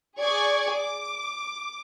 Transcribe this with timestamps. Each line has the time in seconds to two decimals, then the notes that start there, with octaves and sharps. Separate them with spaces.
0.18 G#4 D5 C#6 G#6
0.74 D6